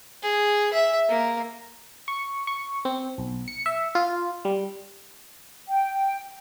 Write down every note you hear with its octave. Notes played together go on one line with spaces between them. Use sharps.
G#4
E5
A#3
C#6
C#6
C4
B1
C#7
E5
F4
G3
G5